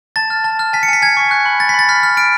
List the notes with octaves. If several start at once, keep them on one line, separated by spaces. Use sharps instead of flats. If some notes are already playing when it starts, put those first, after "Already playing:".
A5 A6
F6
A5
F6
G#5 B6
C#7
G#5 B6
G#5 G#6
C#6
F#6
B5
F#6 A6
B6
B5 A6
F6 B6
F6
F6 D7